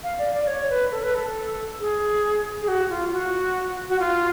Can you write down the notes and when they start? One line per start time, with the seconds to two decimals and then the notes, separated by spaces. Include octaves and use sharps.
0.03 F5
0.19 D5
0.33 D5
0.47 C#5
0.70 B4
0.91 A4
1.03 B4
1.15 A4
1.80 G#4
2.62 G#4
2.68 F#4
2.90 F4
3.12 F#4
3.89 F#4
4.00 F4